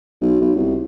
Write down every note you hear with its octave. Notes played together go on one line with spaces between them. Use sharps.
B1
B1
C2